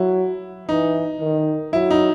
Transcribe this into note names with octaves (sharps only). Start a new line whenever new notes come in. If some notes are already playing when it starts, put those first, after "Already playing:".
Already playing: F#3 E4
E3 D#4
D#3
F#3 E4
D#4